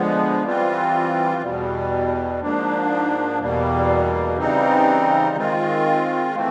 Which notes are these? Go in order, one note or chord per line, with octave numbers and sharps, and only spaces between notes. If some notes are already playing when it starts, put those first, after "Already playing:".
Already playing: D3 F3 G#3 B3
E3 G3 C4 F4
E2 B2 G3
G#2 F3 A#3 D4
E2 B2 G3 A#3
C#3 E3 G3 C4 D#4
D#3 G#3 C4 F4
E3 A3 C4